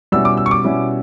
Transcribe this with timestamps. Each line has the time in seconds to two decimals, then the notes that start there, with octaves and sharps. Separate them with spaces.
0.12 B2 G3 C#4 E4 E6
0.25 D6
0.37 E6
0.46 C#6
0.51 D6
0.64 B2 G3 C#4 E4